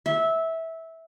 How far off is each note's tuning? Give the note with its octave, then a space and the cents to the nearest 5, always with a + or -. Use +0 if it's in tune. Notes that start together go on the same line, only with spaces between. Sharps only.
E5 -15